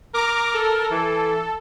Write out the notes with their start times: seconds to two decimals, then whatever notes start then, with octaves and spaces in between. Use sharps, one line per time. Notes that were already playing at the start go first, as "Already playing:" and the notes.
0.14 A#4 A#5 D6
0.54 A4
0.91 E3